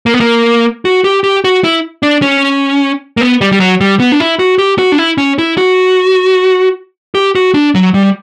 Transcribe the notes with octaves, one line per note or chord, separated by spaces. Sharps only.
A#3
B3
A#3
F#4
G4
G4
F#4
E4
D4
C#4
A#3
B3
G3
G3
F#3
G3
B3
D4
E4
F#4
G4
F#4
D4
E4
C#4
E4
F#4
G4
F#4
D4
F#3
G3